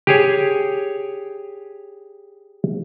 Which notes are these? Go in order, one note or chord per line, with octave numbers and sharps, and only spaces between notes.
G4 G#4 C#5